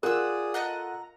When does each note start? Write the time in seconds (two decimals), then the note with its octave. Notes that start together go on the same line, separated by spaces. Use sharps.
0.03 F4 G#4 A#4 D5 F#5 D#6 E6
0.54 A4 D#5 F#5 A#5